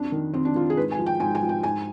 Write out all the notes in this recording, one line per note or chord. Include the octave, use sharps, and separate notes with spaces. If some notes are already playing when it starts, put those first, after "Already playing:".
Already playing: F2 D4
D#3
F2 C4
D4
D#3 F4
G#4
G#2 B4
G#5
F3
G5
G#2 G#5
G#5
F3
G5
G#2 G#5